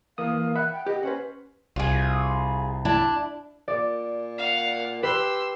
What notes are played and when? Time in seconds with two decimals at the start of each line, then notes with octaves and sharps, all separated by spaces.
0.18 E3 A#3 F5 D#6
0.56 E5 F#5 B5 F#6
0.72 G5
0.86 G4 D#5
1.03 C#4 B4 C5 F#5
1.76 C2 F4 G#4
2.85 D4 E4 A5
3.68 A#2 D5
4.38 F5 F#5
5.03 G4 B4 C6 E6